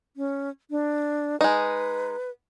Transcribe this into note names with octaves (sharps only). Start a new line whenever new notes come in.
C#4
D4
G#3 D#4 B4